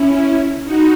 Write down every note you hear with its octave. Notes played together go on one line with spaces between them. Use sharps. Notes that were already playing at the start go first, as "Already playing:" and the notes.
Already playing: C#4 E4
D#4 F#4